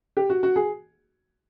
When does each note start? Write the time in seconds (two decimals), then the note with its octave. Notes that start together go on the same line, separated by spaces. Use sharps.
0.17 G4
0.30 F#4
0.43 F#4
0.56 G#4